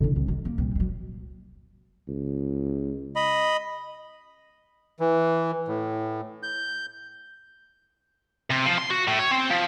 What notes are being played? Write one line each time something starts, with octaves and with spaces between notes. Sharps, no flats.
D3 E4
C2
D#3
A#3
C2 A#2
F#3 G#3
C#2
D#5 B5
E3
A2
G6
C3
F3
C6
F#4
A2
C#5
C4
F3